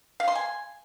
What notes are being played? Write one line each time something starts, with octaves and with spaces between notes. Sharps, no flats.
F5
C6
G#5